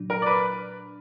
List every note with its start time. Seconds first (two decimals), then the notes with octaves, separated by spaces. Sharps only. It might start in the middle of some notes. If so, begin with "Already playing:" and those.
Already playing: A#2 F#3 D4
0.10 A#4
0.22 D5
0.26 B4